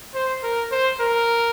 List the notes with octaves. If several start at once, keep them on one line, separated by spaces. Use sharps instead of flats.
C5
A#4
C5
A#4